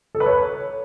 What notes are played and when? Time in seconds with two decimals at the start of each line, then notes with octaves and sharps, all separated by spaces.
0.15 A4
0.20 B4
0.26 C#5